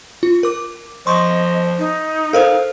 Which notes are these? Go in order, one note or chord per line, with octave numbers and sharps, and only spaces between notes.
F4
A#4 D6
F3 D#5 C6 C#6
D#4
A4 A#4 C5 F5